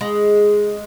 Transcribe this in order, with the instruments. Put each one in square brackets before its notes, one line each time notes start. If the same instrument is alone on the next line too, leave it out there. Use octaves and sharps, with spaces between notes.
[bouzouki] G#3